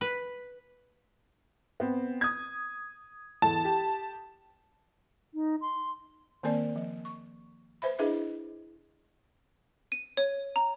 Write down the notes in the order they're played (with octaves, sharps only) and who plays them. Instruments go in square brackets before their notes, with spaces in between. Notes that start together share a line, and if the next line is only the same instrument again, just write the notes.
[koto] B4
[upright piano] B3 C4
D#6 G#6
[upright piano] E2 A4 [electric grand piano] A5
[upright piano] G4
[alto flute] D#4
C6
[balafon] D#3 A#3 C4 A#4 D5
F3
C#6
B4 C5 E5 B5
D4 E4 G#4 B4 D#5 E5
[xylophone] D#7
C#5
A#5